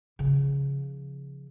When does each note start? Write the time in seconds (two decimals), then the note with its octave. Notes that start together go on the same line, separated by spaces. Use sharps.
0.19 C#3 F3